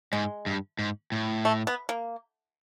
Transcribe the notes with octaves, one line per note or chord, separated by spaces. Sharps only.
G#2 G#3
G2
G#2
A2
A3
B3
A#3